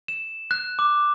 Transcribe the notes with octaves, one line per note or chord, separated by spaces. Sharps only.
E7
F#6
D6